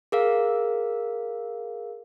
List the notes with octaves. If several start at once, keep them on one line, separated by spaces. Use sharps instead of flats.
G#4 A#4 F5